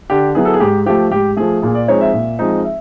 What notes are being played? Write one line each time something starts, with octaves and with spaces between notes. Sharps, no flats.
D3 G4
F#3 B3 E4 G#4
A4
G#4
G#2 G4
F3 A3 G4
G#2 G4
F3 A3 G#4
A#2 G#4
D5
F3 G#3 C4 D#4 C#5
E5
A#2
F3 G#3 C4 D#4
E5